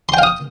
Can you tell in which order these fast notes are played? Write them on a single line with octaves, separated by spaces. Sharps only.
C6 G5 F5 D#6